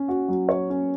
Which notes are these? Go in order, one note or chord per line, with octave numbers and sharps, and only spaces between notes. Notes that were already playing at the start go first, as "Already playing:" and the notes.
Already playing: C#4
F#4
F#3
C#5
C#4